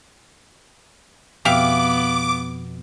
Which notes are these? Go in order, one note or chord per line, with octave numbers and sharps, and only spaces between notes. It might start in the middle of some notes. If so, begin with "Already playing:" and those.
F2 B2 B3 G4 E5 F5 D6